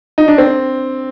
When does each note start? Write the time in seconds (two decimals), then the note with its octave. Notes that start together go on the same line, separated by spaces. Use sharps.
0.18 D#4
0.28 D4
0.38 C4